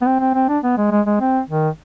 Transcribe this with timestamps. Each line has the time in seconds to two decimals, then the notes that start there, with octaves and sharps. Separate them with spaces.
0.02 B3
0.07 C4
0.20 C4
0.34 C4
0.49 D4
0.64 B3
0.78 G#3
0.91 G#3
1.06 G#3
1.21 C4
1.49 D#3